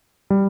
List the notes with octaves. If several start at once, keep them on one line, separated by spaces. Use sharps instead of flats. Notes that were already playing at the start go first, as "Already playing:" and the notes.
G3